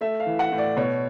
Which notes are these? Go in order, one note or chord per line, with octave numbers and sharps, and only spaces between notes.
A3 E5
F5
E3
F#5
A2
D5
B2 C#5